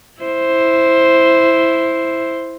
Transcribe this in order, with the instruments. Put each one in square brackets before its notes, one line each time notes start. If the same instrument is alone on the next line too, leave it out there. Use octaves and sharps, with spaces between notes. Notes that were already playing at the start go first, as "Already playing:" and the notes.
[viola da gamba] E4 C5